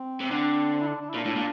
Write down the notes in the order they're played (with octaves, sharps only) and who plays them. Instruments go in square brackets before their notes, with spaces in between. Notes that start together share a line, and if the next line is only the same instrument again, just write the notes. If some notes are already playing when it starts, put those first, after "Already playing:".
Already playing: [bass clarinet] C4
[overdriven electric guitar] C3
D3
[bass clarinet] C4
E4
D4
D4
E4
[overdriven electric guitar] A#2
[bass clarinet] D4
[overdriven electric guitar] A2
A#2